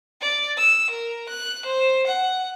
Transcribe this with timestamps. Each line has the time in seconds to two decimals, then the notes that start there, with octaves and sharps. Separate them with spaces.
0.21 D5
0.57 E6
0.91 A#4
1.29 F#6
1.65 C5
2.07 F#5